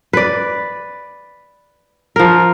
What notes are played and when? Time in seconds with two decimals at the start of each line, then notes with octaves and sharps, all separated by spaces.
0.13 B4 D5
2.16 F3 A#4